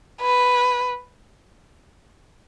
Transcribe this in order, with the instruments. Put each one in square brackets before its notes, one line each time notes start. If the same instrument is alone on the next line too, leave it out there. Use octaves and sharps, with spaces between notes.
[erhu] B4